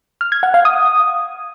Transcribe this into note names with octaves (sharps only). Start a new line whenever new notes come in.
F6
G#6
F#5
F5
D#6